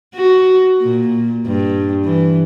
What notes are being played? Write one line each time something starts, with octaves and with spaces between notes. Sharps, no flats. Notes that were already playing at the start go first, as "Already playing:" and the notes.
F#4
A#2
G2
E3